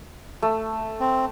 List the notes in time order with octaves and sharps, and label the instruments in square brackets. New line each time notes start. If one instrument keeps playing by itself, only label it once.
[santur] A3
[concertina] C4